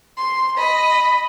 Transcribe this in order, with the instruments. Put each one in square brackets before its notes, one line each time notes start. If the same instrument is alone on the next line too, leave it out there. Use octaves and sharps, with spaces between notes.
[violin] C6
[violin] D#5 [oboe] B5